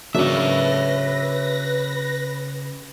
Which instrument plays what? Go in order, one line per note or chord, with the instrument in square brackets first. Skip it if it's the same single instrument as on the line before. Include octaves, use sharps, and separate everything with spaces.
[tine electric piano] C#3 [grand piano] F#3 A#3 D4 [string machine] B4 A#6 [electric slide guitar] C#5 E5